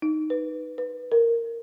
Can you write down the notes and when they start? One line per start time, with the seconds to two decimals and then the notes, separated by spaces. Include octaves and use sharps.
0.02 D#4
0.30 B4
0.78 B4
1.12 A#4